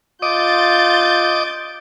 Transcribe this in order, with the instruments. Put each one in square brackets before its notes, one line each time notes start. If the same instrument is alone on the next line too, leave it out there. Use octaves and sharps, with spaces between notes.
[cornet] F4 [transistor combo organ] D#5 D6 [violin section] G6 A6